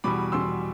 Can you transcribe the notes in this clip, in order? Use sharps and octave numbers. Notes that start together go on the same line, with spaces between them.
E2 B2 G3 B5 D6
E2 B2 G3 C6 E6